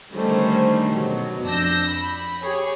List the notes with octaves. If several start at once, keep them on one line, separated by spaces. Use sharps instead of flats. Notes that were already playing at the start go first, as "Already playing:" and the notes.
D3 D#3 G3 A3 C#4 C5
B2 F#3
F2 D4 E6 G6 A#6
B5
G4 G#4 C#5